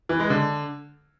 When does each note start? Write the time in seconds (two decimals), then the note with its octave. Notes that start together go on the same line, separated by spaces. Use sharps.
0.09 E3
0.20 G#3
0.30 D3